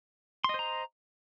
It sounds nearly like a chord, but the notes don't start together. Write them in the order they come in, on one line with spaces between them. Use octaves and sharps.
C6 D#5 C5 A#5